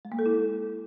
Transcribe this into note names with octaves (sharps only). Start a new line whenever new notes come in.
G#3
A#3
A4
E4